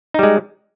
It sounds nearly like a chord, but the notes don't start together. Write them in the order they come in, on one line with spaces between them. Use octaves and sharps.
D#4 G3 G#3